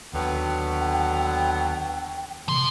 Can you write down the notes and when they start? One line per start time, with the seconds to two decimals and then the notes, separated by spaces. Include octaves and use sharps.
0.13 D#2 D3 F#3 B3 G5
2.48 C3 E3 F3 C6